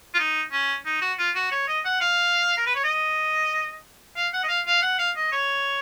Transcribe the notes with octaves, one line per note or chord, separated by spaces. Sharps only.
F4
D#4
C#4
D#4
F#4
F4
F#4
C#5
D#5
F#5
F5
A#4
B4
C#5
D#5
F5
F#5
D#5
F5
F5
F#5
F5
D#5
C#5